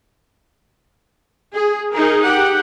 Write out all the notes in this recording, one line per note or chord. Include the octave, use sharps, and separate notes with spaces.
G#4
D#4 G#4 A#4
G4 F#5